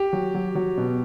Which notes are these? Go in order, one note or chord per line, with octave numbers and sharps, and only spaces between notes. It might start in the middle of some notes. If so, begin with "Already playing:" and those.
Already playing: G4
F#3
F#3
F#3
B2